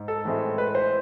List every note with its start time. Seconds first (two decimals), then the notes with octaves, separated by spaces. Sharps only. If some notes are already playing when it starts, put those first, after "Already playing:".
Already playing: G#2
0.08 A4
0.25 A2 E3 G#3 C4 E4
0.58 B4
0.75 C5